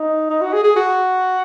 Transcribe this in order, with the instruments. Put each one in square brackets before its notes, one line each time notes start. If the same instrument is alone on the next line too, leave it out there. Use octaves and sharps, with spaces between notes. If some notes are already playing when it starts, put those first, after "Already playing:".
Already playing: [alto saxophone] D#4
D#4
F#4
G#4
G#4
F#4